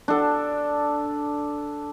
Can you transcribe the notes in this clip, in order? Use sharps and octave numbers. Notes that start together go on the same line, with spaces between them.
D4 A4